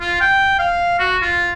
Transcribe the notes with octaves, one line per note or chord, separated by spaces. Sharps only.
F4
G5
F5
F#4
F4